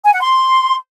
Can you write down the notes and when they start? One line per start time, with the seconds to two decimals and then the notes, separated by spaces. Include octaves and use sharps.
0.05 G#5
0.13 F#5
0.21 C6